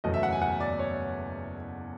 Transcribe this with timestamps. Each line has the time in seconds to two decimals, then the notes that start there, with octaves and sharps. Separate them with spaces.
0.04 F#1 E2 B2 F#3 A3 D#5
0.14 E5
0.23 F#5
0.32 G#5
0.42 F#5
0.60 D5
0.79 C#5